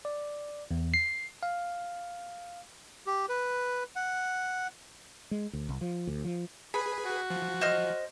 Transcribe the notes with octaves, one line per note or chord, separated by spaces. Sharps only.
D5
E2
C7
F5
G4
B4
F#5
G#3
D2
C2
F3
D2
F3
G#4 B4 B5
F#4
F3
C5 D#5 F6